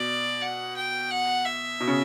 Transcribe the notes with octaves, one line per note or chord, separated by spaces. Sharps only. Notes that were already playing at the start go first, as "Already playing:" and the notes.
Already playing: B2 D5
F#5
G5
F#5
E5
B2
C#3